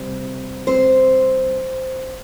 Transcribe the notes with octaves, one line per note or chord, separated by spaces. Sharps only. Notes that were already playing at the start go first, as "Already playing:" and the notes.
Already playing: C3 G3 C4
C4 C5